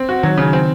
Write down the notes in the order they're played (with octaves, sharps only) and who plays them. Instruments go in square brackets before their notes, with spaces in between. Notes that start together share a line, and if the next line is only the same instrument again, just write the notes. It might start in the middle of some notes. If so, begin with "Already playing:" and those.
Already playing: [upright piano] C4
F#4
[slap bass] D#3 [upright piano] F#3
[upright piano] C#3
C4